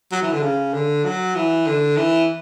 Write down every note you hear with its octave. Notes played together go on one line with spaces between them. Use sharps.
F#3
E3
D3
C#3
D3
F#3
E3
D3
E3